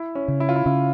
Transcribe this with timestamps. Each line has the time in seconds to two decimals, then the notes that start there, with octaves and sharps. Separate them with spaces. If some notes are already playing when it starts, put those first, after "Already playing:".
Already playing: E4
0.15 C#4
0.28 C#3
0.40 E4
0.49 F4
0.56 E4
0.66 C#3 E4